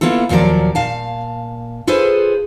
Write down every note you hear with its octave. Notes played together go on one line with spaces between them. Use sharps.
A#3 B3 E4 F4 A4
D#2 A#2 F3 F#3 A#4 D5
A#2 F5 A5
F4 G#4 A4 B4 C5